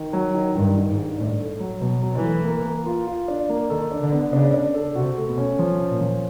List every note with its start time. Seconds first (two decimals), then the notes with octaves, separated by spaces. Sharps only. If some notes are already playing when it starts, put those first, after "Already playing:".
Already playing: D#3
0.13 F#3
0.34 D#3
0.55 G2 D#3
0.76 D#3
0.87 G#2
0.98 D#3
1.18 A2 D4
1.40 A3
1.60 F#3
1.81 B2 F#3
2.03 F#3
2.13 E3
2.24 A3
2.44 A#3
2.65 A#3
2.86 F4
3.07 F4
3.28 D4
3.49 A#3
3.70 D#3 A4
3.91 D4
4.01 D3
4.12 B3
4.33 C#3 D4
4.54 D4
4.75 A4
4.95 C3 F#4
5.17 A3
5.27 B2
5.38 C#4
5.59 F3
5.80 C#4
5.90 A#2
6.01 F3